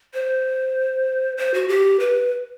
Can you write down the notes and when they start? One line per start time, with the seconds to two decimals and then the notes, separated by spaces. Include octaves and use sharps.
0.14 C5
1.37 C5
1.54 F#4
1.68 G4
2.00 B4